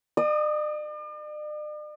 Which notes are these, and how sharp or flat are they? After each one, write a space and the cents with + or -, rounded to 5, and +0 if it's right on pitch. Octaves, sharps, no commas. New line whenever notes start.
D5 +45 D#6 +0